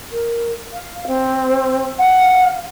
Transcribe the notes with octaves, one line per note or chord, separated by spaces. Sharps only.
A#4
F5
C4
F5 F#5